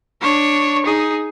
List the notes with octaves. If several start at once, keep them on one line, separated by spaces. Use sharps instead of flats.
D4 C#5
D#4 G#4